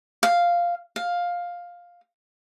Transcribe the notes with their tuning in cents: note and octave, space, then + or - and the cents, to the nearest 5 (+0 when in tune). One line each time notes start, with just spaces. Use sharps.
F5 -5
F5 +10